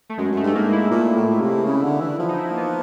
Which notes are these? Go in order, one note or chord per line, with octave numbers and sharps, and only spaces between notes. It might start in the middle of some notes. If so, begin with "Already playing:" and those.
A3
F#2 G#3
F#2 A3
G2 A3
G#2 A#3
E4
A#2
A2
C3
C#3
D3
E3
F3
D#4
E4
A#3
B3